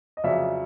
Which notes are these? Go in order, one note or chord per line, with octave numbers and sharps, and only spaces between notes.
D#5
F2 C#3 F#3 D5 E5